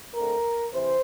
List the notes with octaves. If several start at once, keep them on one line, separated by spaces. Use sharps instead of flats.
D3 A3 C4 A#4
C3 E3 C5